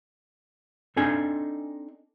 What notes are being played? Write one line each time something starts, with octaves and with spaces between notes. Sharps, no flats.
C4 D4 D#4 A4 G#5